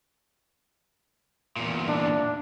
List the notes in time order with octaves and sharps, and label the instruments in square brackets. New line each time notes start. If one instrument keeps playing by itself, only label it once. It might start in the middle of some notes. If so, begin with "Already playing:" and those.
[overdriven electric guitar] E2 A#2
[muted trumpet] D4